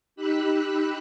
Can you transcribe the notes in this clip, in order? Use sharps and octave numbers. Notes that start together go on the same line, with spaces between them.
D#4 G4 B5 E6 F#6